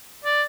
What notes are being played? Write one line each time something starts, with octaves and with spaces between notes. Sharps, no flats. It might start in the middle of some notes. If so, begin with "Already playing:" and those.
D5